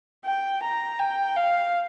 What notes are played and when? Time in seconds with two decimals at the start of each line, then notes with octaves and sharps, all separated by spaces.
0.25 G5
0.63 A#5
0.99 G5
1.36 F5